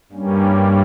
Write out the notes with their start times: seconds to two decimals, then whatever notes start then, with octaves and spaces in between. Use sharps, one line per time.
0.12 G2 G3 A#3 C#4